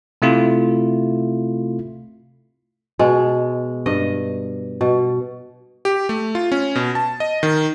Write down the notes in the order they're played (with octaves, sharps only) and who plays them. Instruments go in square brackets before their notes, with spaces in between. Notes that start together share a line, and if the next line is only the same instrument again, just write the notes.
[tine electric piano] C3 A3 E4 F4
[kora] B2 G#3
G2 D#5
B2
[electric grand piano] G4
A3
F4
C#4
B2
A5
D#5
D#3